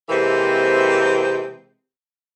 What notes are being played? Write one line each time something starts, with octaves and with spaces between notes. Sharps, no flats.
C3 E3 G#3 A#3 C4